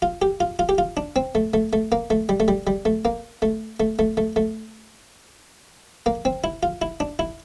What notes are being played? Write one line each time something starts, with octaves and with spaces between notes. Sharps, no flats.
F4
G4
F4
F4
G4
F4
D4
C4
A3
A3
A3
A#3
A3
G3
A3
G3
G3
A3
A#3
A3
A3
A3
A3
A3
A#3
C4
E4
F4
E4
D4
E4